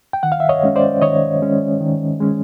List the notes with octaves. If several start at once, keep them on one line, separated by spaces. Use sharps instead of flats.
G5
D#3 F#5
F5
E5
C#5 D#5
G#3 C#4
C5 D5
D#3 C#5 D#5
G#3 C#4
D#3
G#3 C#4